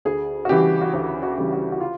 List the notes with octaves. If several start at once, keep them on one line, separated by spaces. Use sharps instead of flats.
D2 G#4
F#4
C#3 E3 G3 G4
F#4
D2 G4
F#4
C#3 E3 G3
F#4
F#4
F4